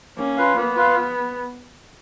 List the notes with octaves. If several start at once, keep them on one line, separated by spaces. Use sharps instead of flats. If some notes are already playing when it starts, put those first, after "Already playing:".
A#3 C#4
F4 B4 F5
A#3 B3
F4 B4 F5